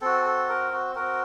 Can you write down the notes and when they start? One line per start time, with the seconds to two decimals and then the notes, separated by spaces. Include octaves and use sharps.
0.01 C4 F#4 A4
0.26 A4
0.49 A#4
0.72 F#4
0.95 C4 F#4 A#4